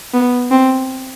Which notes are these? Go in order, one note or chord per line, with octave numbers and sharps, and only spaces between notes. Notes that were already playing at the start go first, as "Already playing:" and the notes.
B3
C4